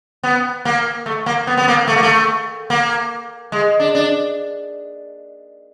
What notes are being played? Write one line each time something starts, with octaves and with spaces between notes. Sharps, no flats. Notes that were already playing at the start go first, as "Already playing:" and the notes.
B3
A#3
A3
A#3
B3
B3
A#3
A3
A#3
A3
A#3
G#3
D4
D4